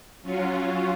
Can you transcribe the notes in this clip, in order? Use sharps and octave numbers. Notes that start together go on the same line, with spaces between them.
F#3 C#4 F4 F#4